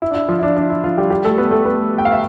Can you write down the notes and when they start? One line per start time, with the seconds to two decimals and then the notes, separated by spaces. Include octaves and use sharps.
0.02 E4
0.11 D4
0.15 E4
0.29 F3 F4
0.39 E4
0.43 D4
0.57 D4
0.70 E4
0.84 F3 F4
0.98 G3 G4
1.10 G3 G4
1.24 A3 A4
1.38 B3 B4
1.51 A3 A4
1.65 B3 B4
1.98 G5
2.05 F5
2.12 E5